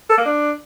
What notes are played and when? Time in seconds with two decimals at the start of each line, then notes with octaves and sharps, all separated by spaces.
0.10 A4
0.18 A#3
0.26 D4